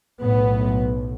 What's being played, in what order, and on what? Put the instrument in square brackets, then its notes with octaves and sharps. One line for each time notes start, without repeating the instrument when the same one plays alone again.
[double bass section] B1 A2 B3